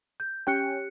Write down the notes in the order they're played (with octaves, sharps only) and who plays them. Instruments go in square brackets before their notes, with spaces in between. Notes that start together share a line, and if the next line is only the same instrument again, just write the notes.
[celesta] G6
[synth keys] C#4 G5 [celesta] G4 F#6 C#7